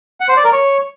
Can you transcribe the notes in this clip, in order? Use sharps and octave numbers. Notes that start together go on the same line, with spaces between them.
F#5
C5
D5
A#4
C#5